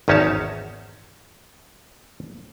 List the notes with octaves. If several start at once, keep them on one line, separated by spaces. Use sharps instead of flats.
G#1 E2 C#4 D#4 C#5 A5